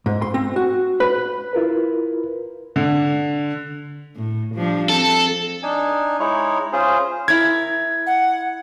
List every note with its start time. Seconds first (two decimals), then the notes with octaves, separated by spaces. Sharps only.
0.06 G#2
0.22 C6
0.34 C4
0.56 F#4
1.00 B4
1.53 E4 F4 A#4 B4
2.76 D3
4.16 A2
4.55 F3 G3 D4
4.89 C4 A4
5.63 D4 D#4 G#5
6.20 G#3 D#4 E4 C#5
6.73 C#4 F4 G#4 C5
7.28 E4 A#4 G#6
8.07 F#5